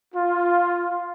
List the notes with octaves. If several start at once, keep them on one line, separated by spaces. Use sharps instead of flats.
F4